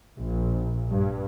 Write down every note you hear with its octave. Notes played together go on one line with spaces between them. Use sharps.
A#1
G2